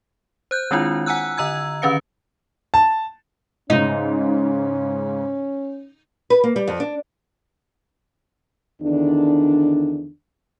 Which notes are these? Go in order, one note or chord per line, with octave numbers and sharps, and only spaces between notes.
C5 F#6 G6
D#3 G#3 C4 D4 E4 F4
F#5 G#5 A#5 E6 F#6
D3 D#5 A#5 E6 G#6
D3 D#3 C#4 B4 F5 C#7
A5
G#2 C#3 C#4 D#4
B4
A#3
G3
F2
D4
E2 D3 D#3 D4